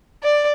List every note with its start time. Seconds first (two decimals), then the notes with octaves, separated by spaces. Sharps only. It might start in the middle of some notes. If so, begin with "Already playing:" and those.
0.23 D5